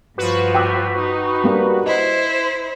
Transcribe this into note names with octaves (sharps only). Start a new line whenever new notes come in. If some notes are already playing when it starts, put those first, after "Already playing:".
G2 F3 F#4 B4
G5 D6 E6
D#4
G3 A#3 D4
E4 C5 D#5